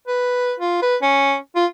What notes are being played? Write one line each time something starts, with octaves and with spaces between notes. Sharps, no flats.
B4
F4
B4
C#4
F4